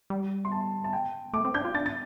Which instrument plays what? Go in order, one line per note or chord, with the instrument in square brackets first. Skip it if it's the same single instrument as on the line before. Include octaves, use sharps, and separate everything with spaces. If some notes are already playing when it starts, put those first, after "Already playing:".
[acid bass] G3
[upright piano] C6
A5
A5
G5
[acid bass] A3 [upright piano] D6
[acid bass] C4
[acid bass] D4 [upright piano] G6
[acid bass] F4
[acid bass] D4 [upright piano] A6
[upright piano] A6